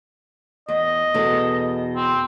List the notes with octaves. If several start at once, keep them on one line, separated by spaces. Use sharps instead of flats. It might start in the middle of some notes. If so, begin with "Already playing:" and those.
E2 D#5
E2 B2 A4
C4